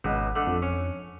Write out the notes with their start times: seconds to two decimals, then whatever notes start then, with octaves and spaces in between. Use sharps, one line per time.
0.04 G#1 C#2 B2
0.36 D3 A3 B5
0.47 F2
0.62 C#4